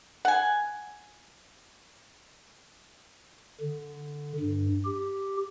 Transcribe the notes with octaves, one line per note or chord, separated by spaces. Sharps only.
F#5 G#5
D3
G2
G4